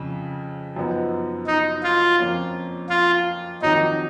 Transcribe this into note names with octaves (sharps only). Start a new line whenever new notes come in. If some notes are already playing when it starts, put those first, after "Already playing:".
Already playing: F2 C#3
F#2 F3 B3 D#4
D#4
F4
F2 F3 A#3 C#4
F4
F2 D#3 F#3 A#3 D#4